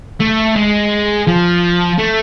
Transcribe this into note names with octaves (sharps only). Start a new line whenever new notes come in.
A3
G#3
F3
A3